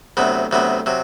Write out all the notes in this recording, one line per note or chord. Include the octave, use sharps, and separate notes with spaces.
D2 C3 F#3 B3
D2 C3 F#3 B3
C3 F#3